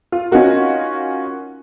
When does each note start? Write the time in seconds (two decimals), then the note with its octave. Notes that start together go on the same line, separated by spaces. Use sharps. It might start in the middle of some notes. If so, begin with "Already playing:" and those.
0.12 F4
0.31 C#4 D#4 F4 F#4 A#4